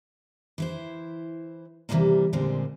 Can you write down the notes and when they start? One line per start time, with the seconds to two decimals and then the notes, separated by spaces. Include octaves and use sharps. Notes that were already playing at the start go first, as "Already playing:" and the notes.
0.58 E3 E4 C5
1.89 C3 E3 F3 G3 G#3 A#3
2.33 A#2 D3 G3 G#3 C4